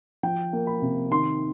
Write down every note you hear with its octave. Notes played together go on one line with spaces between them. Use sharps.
F3 G5
A#3
B5
C3
D#3 C6